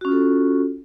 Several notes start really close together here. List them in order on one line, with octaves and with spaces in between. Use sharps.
F#4 C#4 F4 A4